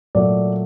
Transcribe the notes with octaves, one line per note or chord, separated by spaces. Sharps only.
A#2 F#3 A3 D5